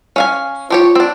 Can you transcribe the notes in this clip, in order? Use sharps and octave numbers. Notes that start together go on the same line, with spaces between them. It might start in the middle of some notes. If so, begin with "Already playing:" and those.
C#4 F5 G#5
F3 F4 G4 C#5
C4 D4